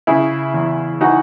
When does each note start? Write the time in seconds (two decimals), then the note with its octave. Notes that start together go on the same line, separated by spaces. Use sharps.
0.07 C#3 E4 G#4
0.54 E2
1.01 E3 D#4 F#4